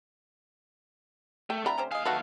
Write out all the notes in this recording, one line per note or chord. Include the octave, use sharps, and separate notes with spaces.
A3 G5
D3 A3 C4 F4 G5 A#5 B5
C#4 G4 C5
D#2 G#4 D#5 F5
F#3 A3 F#4 A4 B4